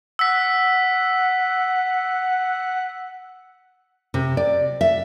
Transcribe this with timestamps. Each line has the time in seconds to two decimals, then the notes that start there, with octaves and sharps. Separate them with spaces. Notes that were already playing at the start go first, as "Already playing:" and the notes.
0.19 F#5 E6 B6
4.14 C3
4.37 D5
4.81 E5